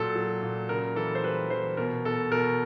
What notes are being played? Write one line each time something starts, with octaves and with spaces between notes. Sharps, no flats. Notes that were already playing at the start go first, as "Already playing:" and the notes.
Already playing: A#2 F#3 A4
F#3
A#2
C#3 A#4
E3 A4
C5
G3 B4
E3 C5
B2 A#4
B2 A4
B2 A#4